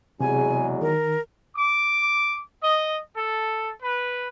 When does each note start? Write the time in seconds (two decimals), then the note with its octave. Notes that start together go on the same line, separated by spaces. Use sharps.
0.20 E2 C3 F#3 G#3 G#5
0.82 D#3 A#4
1.56 D6
2.62 D#5
3.16 A4
3.82 B4